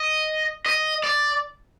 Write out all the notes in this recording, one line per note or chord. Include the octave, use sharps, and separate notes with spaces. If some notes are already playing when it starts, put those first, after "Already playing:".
Already playing: D#5
D#5
D5